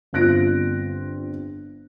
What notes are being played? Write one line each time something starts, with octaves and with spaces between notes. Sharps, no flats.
G1 C4 F4 F#6 A#6 D7